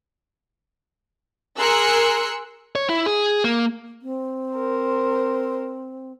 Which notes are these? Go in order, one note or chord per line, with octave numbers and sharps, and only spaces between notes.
G#4 A#4 C6 E6 F#6 C#7
C#5
E4
G#4
A#3
C4
A#4 C5